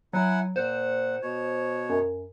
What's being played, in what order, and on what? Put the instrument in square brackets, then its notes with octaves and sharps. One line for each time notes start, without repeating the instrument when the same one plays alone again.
[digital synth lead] F#3 [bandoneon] E4 F#5 G#5
[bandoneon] A#2 F#5 [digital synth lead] C5
[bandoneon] B2 C#5
[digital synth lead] F#2